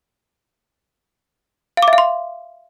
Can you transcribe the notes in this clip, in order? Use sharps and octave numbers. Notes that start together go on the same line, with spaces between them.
F5
D6
E5
F5
C6